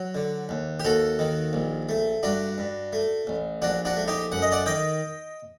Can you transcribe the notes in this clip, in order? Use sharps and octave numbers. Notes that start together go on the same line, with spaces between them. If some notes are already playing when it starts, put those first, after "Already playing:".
Already playing: F#3
D3
D#2
G4
D#2 F#4 A4
D#3
A#1
A3
G2 D4 F#4
G2
A3
A1
A#1 D4 F#4
D4 F#4
A3
D#4 G4
F#2 F#5
D#5
D5 F#5
D#3 D#5 G5